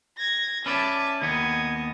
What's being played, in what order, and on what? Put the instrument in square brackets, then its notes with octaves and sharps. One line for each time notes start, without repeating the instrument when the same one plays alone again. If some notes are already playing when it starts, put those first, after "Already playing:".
[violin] G#6 A#6
[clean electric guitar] C#4 B4 D5 [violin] E5 A5
[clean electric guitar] D#2 B3 [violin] D#5 [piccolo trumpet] G#6